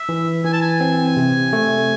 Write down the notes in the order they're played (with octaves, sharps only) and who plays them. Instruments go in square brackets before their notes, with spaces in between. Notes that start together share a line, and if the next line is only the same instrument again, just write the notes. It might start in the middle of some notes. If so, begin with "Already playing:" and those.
Already playing: [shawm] E5
[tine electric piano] E3
[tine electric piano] E3 [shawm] G#5
[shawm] A5
G#5
[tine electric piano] C4
C3
A3